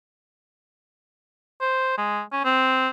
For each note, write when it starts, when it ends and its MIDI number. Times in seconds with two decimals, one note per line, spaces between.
1.62 1.95 72
1.98 2.22 56
2.33 2.42 61
2.45 2.89 60